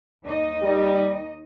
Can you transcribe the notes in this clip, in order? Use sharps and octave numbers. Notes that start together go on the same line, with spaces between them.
D#2 D#4 D#5
G3